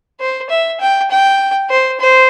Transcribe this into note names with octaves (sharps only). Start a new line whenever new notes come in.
C5
E5
G5
G5
C5
C5